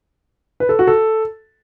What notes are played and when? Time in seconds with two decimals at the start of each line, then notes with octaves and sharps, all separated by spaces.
0.60 B4
0.69 A4
0.79 F#4
0.87 A4